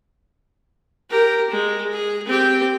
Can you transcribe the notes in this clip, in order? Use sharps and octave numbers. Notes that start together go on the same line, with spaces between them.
G4 A#4
G#3
G#4
C4 G4